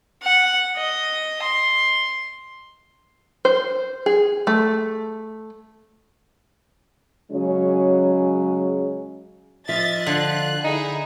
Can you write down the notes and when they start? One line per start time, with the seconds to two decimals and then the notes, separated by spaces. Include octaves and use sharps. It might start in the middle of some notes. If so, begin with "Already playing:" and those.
0.24 F#5
0.77 D#5
1.43 C6
3.45 C5
4.06 G#4
4.47 A3
7.31 C#3 F#3 G#3 C#4 G#4
9.69 F3 D#5 E5 A6
10.06 D3 F4 F#6
10.64 D#4 E4 G#4 G#5